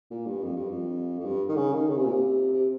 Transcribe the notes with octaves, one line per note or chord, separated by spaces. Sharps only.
A#2
G2
F2
G2
F2
F2
G2
D#3
C#3
D#3
C#3
C3
A#2
C3
C3